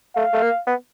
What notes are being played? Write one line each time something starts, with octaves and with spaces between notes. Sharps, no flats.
A3 F5
A3
A#3
B3